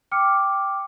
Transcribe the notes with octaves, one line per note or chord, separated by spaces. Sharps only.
G5 D6 F6 C#7